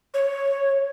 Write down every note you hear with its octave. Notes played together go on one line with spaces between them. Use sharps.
C#5